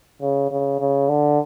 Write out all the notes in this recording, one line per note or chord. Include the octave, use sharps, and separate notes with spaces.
C#3
C#3
C#3
D3